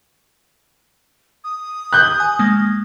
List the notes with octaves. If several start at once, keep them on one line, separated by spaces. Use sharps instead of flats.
D#6
F#6 G6
G#5
G#3 A#3